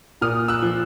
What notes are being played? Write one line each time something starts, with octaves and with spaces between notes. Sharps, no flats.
A#2 D#6 F6
E6 F#6
F3